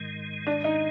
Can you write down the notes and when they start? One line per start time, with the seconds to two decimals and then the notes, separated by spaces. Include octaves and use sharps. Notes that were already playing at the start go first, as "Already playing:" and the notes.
Already playing: G#2 D#3 G#3
0.47 D4
0.64 D#4